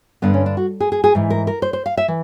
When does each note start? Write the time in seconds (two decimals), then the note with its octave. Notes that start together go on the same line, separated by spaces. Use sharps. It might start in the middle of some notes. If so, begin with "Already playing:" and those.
0.22 G2 D3 B3
0.34 C#4
0.46 D4
0.57 F#4
0.80 G#4
0.92 G#4
1.04 G#4
1.15 G#2 E3
1.30 A#4
1.47 A#4
1.62 C5
1.73 C5
1.86 F5
1.97 E5
2.08 E3